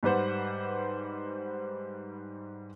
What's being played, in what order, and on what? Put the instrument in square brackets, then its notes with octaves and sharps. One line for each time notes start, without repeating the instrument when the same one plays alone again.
[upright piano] G#2 G3 B4 C5 F#5